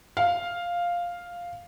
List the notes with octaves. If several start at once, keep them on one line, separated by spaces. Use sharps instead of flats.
F5